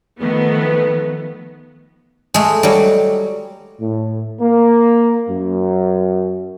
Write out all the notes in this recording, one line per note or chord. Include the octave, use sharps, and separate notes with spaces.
D#3 F3 A3 B3
G#3 A3
F#3 G3
A2
A#3
F#2